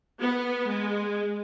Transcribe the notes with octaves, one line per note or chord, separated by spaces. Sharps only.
B3
G#3